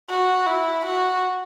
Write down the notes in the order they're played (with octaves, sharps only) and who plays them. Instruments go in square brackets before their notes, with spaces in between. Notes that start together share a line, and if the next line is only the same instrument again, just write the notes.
[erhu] F#4
E4
F#4